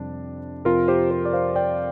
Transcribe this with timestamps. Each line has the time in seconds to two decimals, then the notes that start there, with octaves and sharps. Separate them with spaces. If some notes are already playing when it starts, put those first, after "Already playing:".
Already playing: F2 C3 G3 C4 D4
0.65 F2 C3 F3 C4 F4 A#4
0.88 G4 C5
1.11 G4 C5
1.25 D5
1.33 C5 F5
1.56 D5 G5